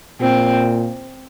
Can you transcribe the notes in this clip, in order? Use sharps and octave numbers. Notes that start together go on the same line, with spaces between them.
A#2 C4